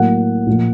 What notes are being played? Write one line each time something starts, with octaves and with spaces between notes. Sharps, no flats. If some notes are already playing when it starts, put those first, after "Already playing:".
Already playing: A2 F#3 A#3 F#5
A#2 F3 A#3